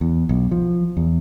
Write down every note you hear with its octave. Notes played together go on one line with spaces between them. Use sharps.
E2
B1
F3
E2